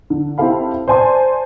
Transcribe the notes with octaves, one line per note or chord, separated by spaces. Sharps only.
D3
C4 E4 G4 A4 F5 B5
C5 D5 G#5 A5 C6